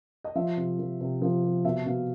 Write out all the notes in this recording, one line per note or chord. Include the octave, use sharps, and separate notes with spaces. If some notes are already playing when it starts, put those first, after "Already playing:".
D#5
F3 E5
C3
F3
C3
F3
C3
B2 E5
B2 F5